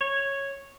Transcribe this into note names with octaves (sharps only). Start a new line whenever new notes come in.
C#5